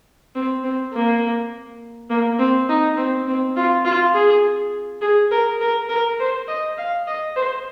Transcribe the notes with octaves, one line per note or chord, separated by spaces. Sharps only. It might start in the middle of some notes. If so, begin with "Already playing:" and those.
C4
C4
A#3
A#3
C4
D#4
C4
C4
F4
F4
G#4
G#4
A#4
A#4
A#4
C5
D#5
F5
D#5
C5